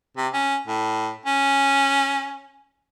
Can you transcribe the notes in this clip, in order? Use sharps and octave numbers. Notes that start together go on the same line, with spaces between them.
C3
C#4
A2
C#4